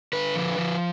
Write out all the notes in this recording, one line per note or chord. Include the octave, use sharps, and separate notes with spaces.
D3 B4
F3
F3